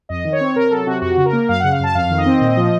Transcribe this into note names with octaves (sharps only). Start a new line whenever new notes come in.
F2 D#5
D#3
C#5
C4
C3 A#4
F#3 A4
C3 F#4
F2 F#4
C#3
A#4
A#3
F#2 F5
C#3 F#5
F5
F#2 A5
F2 F5
D#3
D#5
C4
A#2
F3